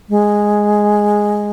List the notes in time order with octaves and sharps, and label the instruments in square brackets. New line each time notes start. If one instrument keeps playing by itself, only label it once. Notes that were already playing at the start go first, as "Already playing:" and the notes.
[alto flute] G#3